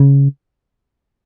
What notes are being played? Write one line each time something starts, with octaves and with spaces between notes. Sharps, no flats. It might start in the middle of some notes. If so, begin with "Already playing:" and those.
Already playing: C#3